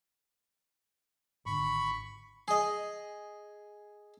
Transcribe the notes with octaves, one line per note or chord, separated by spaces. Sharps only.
G#1 D3 B5 C#6
G#4 D#5